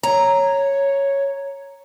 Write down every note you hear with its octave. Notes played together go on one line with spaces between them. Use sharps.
C#5 A#5